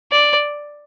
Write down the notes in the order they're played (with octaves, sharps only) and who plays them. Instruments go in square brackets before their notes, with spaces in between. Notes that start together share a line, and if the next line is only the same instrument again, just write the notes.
[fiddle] D5